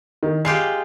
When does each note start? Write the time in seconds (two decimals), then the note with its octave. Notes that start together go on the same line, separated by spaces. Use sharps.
0.23 D#3
0.45 G#3 F4 G4 C7